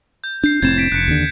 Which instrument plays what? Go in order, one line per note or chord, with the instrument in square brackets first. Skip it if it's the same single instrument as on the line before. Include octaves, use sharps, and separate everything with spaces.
[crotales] G6
[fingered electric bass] D4 [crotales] G6 C7
[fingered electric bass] F1 A2 C4 [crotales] G#6 A6 E7
[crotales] B6 D7
[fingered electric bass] F1 [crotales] F#6 C#7
[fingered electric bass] D#2 D3